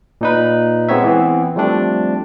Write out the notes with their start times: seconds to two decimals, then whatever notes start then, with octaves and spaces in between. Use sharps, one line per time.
0.21 A#2 D#4 B4
0.89 G#3 B3 C4 C#5 E5
1.04 E3 B3 C4
1.56 F3 G3 A3 C4 D4